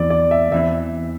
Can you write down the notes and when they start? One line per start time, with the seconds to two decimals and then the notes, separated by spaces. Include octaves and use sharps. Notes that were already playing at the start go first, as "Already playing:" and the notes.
Already playing: E2 E3 C4 D5
0.10 D5
0.31 E5
0.52 E2 E3 C4 E5